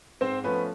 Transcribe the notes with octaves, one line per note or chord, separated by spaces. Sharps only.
G#2 C4 C5
F3 A3 B3 C#4 B4